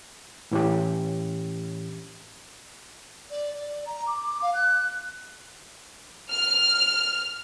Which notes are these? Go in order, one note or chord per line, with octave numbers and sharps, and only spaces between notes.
A2 E3 C#4 G4
D5
D5
A#5
D6
D6
F5
F#6
F6